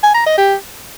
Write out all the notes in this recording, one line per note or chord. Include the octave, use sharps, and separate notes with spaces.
G#5
A#5
D#5
G4